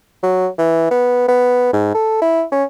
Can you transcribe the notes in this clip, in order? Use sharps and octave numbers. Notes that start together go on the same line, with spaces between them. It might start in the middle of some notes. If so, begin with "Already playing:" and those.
F#3
E3
B3
B3
G#2
A4
E4
C#4